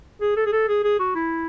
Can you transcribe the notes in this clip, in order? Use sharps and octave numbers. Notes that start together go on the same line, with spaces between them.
G#4
A4
G#4
A4
G#4
G#4
F#4
E4